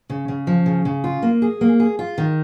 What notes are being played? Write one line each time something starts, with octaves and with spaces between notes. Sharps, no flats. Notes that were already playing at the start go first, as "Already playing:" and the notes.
C#3
C#3
F3
C#3
C#3
F4
A#3
G#4
A#3
G#4
F4
D#3